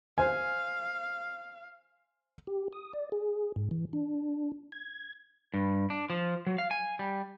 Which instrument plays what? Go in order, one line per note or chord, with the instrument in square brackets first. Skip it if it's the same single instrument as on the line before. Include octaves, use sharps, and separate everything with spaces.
[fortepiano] C5 G#5 [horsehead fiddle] F5
[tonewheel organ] G4
D#6
D5
G#4
G#2
E3
D4
G#6
[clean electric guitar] G2
D4
F3
F#3
F5
G#5
G3